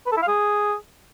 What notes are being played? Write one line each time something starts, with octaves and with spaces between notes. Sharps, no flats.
B4
A4
E4
F5
G#4